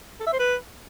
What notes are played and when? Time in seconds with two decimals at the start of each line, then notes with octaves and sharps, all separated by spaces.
0.20 A4
0.27 E5
0.33 C5
0.39 B4